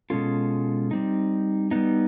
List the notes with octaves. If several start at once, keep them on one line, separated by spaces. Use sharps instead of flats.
B2 G#3 C#4 F4 A4
G3 C4 D#4
G3 B3 D#4